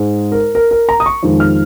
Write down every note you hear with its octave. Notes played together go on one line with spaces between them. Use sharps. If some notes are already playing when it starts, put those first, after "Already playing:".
Already playing: G#2 G#3
A#4
A#4
A#4
A#5
D#6
C#6
F2 D#3 G#3
F6